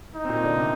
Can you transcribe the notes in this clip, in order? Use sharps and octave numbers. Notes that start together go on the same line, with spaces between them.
D#4
C4
A#2 A#3
D3 D4
C3 C4